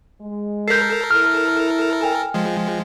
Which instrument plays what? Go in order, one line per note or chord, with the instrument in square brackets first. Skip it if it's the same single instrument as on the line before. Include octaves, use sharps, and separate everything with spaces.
[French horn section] G#3
[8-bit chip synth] A4 A#4 [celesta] G6 B6 C7
[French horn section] E4 [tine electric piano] F6
[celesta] G5 G#5
[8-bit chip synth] F3 G#3